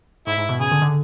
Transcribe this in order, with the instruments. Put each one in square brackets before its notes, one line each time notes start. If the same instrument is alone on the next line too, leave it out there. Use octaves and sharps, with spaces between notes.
[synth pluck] G#2 [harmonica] E4
[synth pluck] G#2
B2
[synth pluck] C#3 [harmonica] G#4
[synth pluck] D3
D3